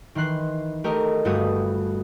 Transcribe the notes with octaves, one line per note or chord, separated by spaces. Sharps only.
D#3 E3 C6 F#6 C7
A3 G4 A#4 D#5
G1 G2 A3 F#4 G4 D#6